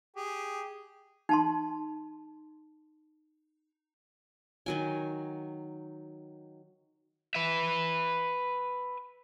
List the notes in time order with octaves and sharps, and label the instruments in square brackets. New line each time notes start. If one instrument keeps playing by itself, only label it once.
[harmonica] G4 G#4
[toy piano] D#4 A5 C6
[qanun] D#3 F#3 G#5
[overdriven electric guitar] B4 E5